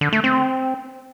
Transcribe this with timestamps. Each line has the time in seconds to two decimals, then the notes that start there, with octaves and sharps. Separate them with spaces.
0.01 D3
0.12 A3
0.24 C4